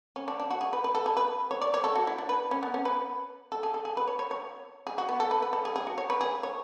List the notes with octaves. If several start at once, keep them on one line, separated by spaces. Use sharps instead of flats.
C#4
D4
D4
F#4
G#4
B4
B4
A4
G#4
B4
C#5
D5
C#5
A4
F#4
E4
D4
B4
C#4
B3
C#4
B4
A4
G#4
A4
G#4
B4
C#5
C#5
C#5
G#4
F#4
B3
A4
B4
B4
A4
G#4
G#4
F#4
C#5
B4
G#4
C#5